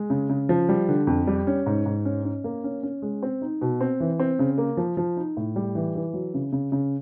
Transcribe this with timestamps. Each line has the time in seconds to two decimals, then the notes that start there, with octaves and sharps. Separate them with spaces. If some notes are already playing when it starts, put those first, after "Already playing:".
Already playing: G#3
0.10 C#3
0.30 C#3
0.49 F3
0.69 G3
0.88 D3
1.07 F2
1.27 G3
1.47 C#4
1.66 G#2
1.86 G#2
2.05 C#4
2.24 C#4
2.44 A#3
2.64 C#4
2.83 C#4
3.02 G#3
3.23 C4
3.42 D#4
3.61 B2
3.81 C4
4.00 E3
4.19 C4
4.39 C#3
4.58 A#3
4.77 F3
4.97 F3
5.17 D#4
5.37 A2
5.56 G3
5.75 E3
5.95 E3
6.14 F#3
6.34 C#3
6.53 C#3
6.72 C#3